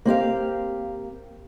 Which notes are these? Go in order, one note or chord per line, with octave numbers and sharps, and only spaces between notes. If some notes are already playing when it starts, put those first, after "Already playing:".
A#3 C4 G4 F5